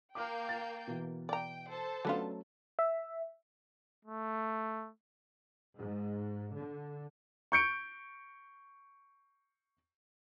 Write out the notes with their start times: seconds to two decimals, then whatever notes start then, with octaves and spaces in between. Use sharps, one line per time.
0.15 A#3 G5 D6 F6 G6
0.49 A6
0.87 B2 E3
1.29 D5 G5 A#5
1.69 A4 C5 A5
2.05 D3 F#3 A3 B3 C#4 F4
2.79 E5
4.05 A3
5.76 G#2
6.55 D3
7.52 C#6 G6 C#7 D7